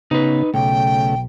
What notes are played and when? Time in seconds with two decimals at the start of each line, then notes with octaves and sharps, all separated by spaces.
0.11 C#3 B3 D#4 B4
0.54 B1 C#3 A3 G5